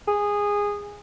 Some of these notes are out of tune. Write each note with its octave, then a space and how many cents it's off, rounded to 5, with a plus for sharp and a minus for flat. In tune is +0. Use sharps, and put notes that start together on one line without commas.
G#4 -15